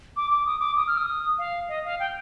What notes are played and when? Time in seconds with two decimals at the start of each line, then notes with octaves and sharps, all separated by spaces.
0.17 D6
0.31 D6
0.46 D#6
0.59 D6
0.77 D#6
0.88 F6
0.98 D#6
1.38 F5
1.69 D#5
1.85 F5
2.00 G5